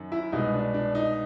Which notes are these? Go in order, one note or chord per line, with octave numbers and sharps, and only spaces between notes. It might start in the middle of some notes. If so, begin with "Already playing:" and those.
Already playing: F#2 D#3
E4
C2 B2 G#3 D#4
D4
D4
D#4